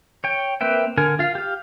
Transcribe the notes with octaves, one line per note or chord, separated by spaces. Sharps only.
C#5 G5
A#3 C4 B4 E5 G5
D3 A#4 G#5
F4 F5
G4 F5